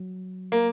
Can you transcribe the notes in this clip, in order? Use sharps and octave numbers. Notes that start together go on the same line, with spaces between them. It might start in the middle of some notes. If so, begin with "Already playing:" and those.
Already playing: F#3
A#3